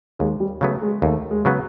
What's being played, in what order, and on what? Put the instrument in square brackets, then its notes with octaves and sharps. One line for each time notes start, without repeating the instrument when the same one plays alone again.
[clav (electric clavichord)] D#2 [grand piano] G#3
[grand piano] G3
[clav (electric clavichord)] C#3 F#3 B3 [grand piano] A3
[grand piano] G#3
[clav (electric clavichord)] D#2 [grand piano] A3
[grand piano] G#3
[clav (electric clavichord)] C#3 F#3 B3